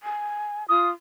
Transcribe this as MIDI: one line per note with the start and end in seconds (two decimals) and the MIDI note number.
0.03 0.67 80
0.69 0.91 65
0.69 0.89 87